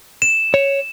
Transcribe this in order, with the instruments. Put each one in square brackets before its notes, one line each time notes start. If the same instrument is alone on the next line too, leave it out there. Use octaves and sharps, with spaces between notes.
[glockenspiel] E7
[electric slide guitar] C#5